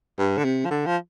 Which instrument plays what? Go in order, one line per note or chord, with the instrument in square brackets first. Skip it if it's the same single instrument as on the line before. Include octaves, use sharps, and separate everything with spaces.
[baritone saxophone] G2
D3
C3
F3
D3
F3